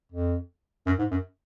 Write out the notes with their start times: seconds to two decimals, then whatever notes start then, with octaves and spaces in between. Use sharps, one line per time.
0.12 F2
0.86 F#2
0.99 G#2
1.11 F#2